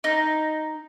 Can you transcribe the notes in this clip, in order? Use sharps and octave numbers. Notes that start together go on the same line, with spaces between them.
D#4